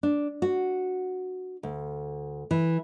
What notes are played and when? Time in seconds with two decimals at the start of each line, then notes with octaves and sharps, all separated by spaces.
0.03 D4
0.42 F#4
1.63 D2
2.51 E3